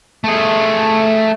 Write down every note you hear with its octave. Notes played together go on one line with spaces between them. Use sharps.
A3 G#4